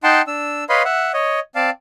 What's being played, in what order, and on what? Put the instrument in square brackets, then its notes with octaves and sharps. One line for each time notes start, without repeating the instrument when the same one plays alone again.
[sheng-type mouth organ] D#4 F#5 G5 A5 C6
D4 E6
B4 C#5 D#5 F5 B5 C6
E5 F#5
C#5 D#5
C4 D5 F5 A5